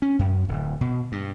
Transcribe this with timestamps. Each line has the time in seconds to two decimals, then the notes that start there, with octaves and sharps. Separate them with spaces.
0.02 C#4
0.19 F#2
0.48 D1
0.81 B2
1.12 G2